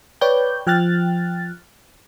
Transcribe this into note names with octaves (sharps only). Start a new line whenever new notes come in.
B4 C#5 D5 G5 G6
F3 G5 F6 F#6 A6